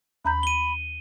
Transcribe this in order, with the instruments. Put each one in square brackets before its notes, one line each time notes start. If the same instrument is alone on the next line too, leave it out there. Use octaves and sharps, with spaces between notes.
[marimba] D#2 A#5 G6 [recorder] B5
[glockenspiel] D#7 G7